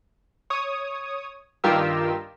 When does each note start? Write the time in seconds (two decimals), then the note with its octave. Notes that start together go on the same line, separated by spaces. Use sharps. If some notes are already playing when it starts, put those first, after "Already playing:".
0.50 C#5 D#6
1.64 G2 D#3 F4 G4 A#4 E6